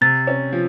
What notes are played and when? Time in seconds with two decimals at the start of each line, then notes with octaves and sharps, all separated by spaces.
0.01 C3 A6
0.27 C#4
0.52 F3